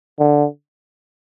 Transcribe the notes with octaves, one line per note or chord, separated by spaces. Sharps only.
D3